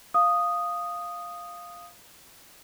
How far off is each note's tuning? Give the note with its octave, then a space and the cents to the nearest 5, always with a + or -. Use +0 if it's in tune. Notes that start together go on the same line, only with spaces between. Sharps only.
F5 +0 D#6 -5